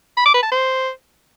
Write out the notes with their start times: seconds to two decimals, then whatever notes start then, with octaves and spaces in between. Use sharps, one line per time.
0.17 B5
0.26 D6
0.34 B4
0.43 A5
0.52 C5